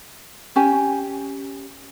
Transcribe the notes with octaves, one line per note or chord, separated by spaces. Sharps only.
C#4 G4 G#5